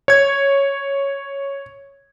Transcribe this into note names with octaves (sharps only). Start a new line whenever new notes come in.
C#5 G#6